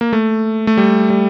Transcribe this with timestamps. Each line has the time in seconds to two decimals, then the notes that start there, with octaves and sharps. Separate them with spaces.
0.01 A#3
0.13 A3
0.67 A3
0.77 G3
1.10 G3